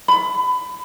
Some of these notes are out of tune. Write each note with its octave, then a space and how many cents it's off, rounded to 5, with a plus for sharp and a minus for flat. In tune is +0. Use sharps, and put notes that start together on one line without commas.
B5 +25